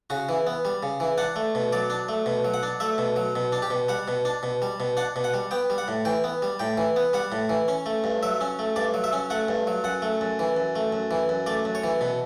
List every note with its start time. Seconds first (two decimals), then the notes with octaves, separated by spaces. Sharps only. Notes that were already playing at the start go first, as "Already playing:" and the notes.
0.10 C#3 F#4
0.29 E3
0.47 B3
0.65 G3
0.83 C#3
1.00 E3
1.18 D4 F#5
1.36 A3
1.55 B2
1.72 F#3 D5
1.90 D4
2.09 A3
2.26 B2
2.44 F#3
2.54 F#5
2.63 D4
2.80 A3 E5
2.98 B2
3.16 F#3
3.36 B2
3.52 D4
3.62 G4
3.70 B2
3.88 G3 F#5
4.08 B2
4.25 D4
4.43 B2
4.62 G3
4.80 B2
4.97 D4 F#5
5.16 B2
5.24 F#5
5.34 G3
5.51 B3 G5
5.70 G3
5.78 F#5
5.88 A2
6.05 E3 G5
6.24 B3
6.42 G3
6.59 A2 G5
6.77 E3
6.96 B3
7.13 G3 F#5
7.32 A2
7.49 E3
7.68 C#4
7.86 A3
8.04 G2
8.23 F#3 E5
8.41 C#4
8.59 A3
8.76 G2 D5
8.94 F#3
9.04 E5
9.13 C#4
9.30 A3 F#5
9.48 G2
9.67 F#3
9.84 F#2 F#5
10.02 A3
10.21 F#2
10.39 E3
10.57 F#2
10.76 A3
10.92 F#2
11.11 E3
11.29 F#2
11.47 A3 D5
11.65 F#2
11.75 C#5
11.84 E3
12.01 B2